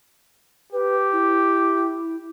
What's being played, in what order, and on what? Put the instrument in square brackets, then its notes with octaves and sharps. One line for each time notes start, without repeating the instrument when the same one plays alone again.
[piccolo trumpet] G4 [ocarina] B4
[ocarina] E4